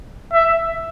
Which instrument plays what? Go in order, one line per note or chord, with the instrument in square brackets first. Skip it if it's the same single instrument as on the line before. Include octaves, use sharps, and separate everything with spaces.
[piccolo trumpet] E5